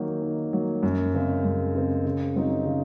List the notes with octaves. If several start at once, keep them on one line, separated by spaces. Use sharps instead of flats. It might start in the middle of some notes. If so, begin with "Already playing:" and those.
Already playing: D#3 F#3 A#3
D#3
F#3 A#3
F#2
C#3 G#3 C4
F#2
C#3 G#3 C4
C#3
F#3 C4 D#4
C#3